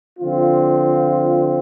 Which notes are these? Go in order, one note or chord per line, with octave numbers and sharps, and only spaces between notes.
D3 F3 C4 F4